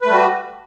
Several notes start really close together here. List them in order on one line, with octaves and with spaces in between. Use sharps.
B4 A3 G3 F#4